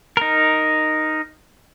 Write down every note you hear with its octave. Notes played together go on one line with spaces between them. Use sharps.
D#4 A#4